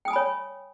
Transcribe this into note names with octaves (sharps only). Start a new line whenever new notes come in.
C#5 G5 G#5 B5 D#6